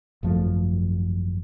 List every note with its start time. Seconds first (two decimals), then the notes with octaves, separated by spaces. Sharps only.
0.23 G#1 F#2 F3 A3